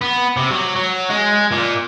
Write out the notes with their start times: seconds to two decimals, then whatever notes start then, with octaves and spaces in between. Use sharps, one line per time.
0.01 B3
0.36 C3
0.51 F#3
0.76 F#3
1.10 G#3
1.51 A#2